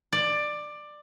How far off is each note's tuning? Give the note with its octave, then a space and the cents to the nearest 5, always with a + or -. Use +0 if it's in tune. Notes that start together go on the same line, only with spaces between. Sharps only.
D5 +15